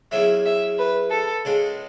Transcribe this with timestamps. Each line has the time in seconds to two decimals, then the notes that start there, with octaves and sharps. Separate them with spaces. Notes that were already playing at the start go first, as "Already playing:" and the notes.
0.12 E2 C#3 F#3 E5
0.45 E5
0.78 B4
1.11 A4
1.45 C#2 C#3 G#3